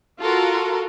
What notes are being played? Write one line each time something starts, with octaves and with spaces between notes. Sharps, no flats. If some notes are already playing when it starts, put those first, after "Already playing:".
F4 F#4 A4 A#4